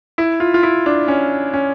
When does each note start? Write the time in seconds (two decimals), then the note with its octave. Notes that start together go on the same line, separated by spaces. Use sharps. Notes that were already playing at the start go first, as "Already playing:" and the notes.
0.18 E4
0.40 F4
0.54 F4
0.63 E4
0.86 D4
1.08 C#4
1.53 C#4